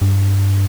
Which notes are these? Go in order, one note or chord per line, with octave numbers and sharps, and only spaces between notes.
G2